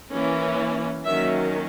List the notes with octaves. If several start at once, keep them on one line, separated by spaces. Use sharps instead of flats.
E3 A#3 C#4
D#3 F#3 A#3 C#4 E5